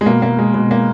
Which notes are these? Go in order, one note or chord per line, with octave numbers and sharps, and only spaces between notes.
G#3
B2 A#3
A#3
G#3
B2 G#3
A#3